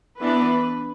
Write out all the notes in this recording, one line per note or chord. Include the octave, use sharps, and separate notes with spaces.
E3 B3 D4 B4